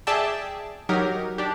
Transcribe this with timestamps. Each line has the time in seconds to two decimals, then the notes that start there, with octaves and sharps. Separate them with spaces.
0.07 G#4 D5 E5 G5 A5
0.89 F#3 D#4 G4 A#4
1.38 D4 G4